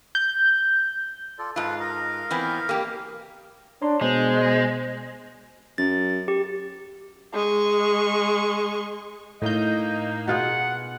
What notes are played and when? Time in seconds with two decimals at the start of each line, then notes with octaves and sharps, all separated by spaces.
0.15 G6
1.39 F4 A4 D5
1.56 G#2 F4 A4 B4
1.80 A#4 D#5 F5
2.31 E3 B3 C4
2.69 A#3 G4
3.82 D4 C#5 A#5 C6
4.01 B2 G#3 B3 C5
5.78 F#2 A6
6.28 G4
7.34 G#3 C#6
9.42 A2 A#3 D#4 D#5 G6
10.28 B2 F4 G#4 F#5